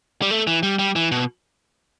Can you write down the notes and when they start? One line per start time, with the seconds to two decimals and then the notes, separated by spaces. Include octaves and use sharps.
0.22 G3
0.31 A3
0.47 E3
0.63 G3
0.79 G3
0.96 E3
1.12 B2